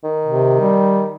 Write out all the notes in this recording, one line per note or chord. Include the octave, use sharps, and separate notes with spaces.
D#3
C3
G3